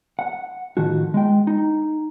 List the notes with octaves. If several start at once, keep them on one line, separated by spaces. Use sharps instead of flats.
F#5
A2 D#3 F3 F#4
G#3 G5
D#4